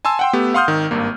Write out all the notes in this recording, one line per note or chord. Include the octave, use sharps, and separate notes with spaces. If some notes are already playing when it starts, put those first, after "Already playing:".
G#5 A5 C6 E6
F#5 G5 C6
A3 B3 G4
F5 F#5 C6 D#6 F6 G6
G#1 D#3
G#1 G2 A#3